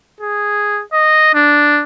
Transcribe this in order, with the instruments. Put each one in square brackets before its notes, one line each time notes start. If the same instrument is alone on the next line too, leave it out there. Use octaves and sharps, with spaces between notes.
[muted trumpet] G#4
D#5
D4